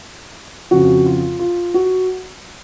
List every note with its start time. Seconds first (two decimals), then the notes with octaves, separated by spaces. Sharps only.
0.71 F2 C#3 F3 F#4
1.06 F4
1.39 F4
1.74 F#4